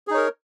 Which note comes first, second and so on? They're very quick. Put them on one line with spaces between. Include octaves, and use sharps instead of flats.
G#4 D#4 C#5 A#4